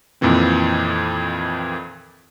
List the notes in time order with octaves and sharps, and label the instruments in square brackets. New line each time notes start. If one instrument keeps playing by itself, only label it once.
[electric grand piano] F2 A#2 D#3 E3 C4